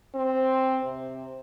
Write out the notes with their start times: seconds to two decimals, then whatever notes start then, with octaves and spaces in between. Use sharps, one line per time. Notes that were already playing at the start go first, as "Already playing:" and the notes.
0.15 C4
0.84 C3